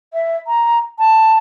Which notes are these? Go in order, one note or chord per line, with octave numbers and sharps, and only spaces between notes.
E5
A#5
A5